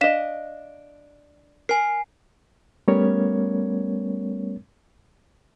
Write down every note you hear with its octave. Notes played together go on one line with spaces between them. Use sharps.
D4 D#5 F5 B6 E7
A#4 G#5 C7
G3 A3 B3 C#4 A#4 C#5